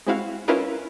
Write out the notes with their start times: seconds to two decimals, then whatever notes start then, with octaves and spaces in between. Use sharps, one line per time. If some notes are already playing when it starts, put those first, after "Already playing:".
0.07 G#3 C4 E4 F#4 F5
0.48 C#4 E4 F4 A#4 B4 D#5